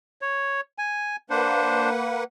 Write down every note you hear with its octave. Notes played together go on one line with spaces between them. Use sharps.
C#5
G#5
A#3 D4 B4 C5 F#5